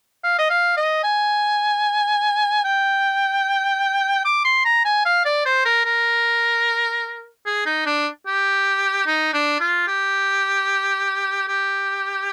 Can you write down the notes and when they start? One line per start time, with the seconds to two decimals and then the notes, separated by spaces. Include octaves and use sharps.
0.24 F5
0.39 D#5
0.50 F5
0.77 D#5
1.04 G#5
2.65 G5
4.25 D6
4.45 C6
4.65 A#5
4.85 G#5
5.05 F5
5.25 D5
5.45 C5
5.65 A#4
5.85 A#4
7.46 G#4
7.66 D#4
7.86 D4
8.26 G4
9.06 D#4
9.34 D4
9.60 F4
9.87 G4
11.48 G4